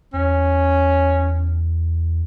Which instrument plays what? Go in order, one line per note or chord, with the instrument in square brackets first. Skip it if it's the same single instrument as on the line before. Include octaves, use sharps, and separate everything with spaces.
[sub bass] E2 [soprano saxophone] C#4